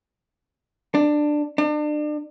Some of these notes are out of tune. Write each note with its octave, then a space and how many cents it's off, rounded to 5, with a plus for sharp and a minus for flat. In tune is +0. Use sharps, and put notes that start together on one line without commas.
D4 +15
D4 +35